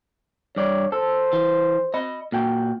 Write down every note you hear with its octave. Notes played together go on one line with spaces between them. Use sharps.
G2 C#5 D5
A4 C5
E3
D#5 B5
A#2 F#4 G5